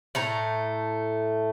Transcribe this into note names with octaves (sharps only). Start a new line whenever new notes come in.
A2 A3 A#5